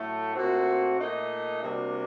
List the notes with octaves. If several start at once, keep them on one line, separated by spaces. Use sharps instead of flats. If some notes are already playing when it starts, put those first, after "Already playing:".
Already playing: A2 F#3 A3
A#2 A3 C4 F#4
A#2 A3 D#4
C3 G3 A#3 D4 F#4